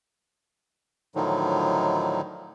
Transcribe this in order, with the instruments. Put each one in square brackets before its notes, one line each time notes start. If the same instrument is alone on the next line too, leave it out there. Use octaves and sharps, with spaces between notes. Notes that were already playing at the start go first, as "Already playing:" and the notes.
[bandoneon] A2 D3 D#3 F3 F#3 D#4